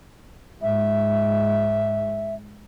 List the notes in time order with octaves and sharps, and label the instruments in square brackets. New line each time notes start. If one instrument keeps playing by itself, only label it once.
[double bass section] G#2 [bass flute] E5